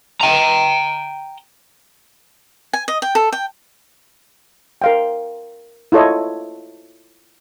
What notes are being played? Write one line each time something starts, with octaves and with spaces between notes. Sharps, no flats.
G5 A#5
G#5
D#5
G5
A4
G5
A#4 F5 G5
E4 F4 A4 C#5 D#5